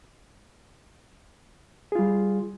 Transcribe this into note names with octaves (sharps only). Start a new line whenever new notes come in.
G3 F4 G#4